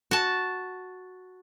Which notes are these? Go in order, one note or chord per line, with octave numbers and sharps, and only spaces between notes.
F#4 A5